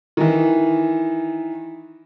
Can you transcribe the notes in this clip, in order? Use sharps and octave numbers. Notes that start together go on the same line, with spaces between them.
D#3 E3